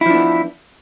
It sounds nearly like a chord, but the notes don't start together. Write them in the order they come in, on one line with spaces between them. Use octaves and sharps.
E4 F3 D4 B3